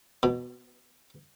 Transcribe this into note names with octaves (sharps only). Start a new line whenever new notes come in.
B2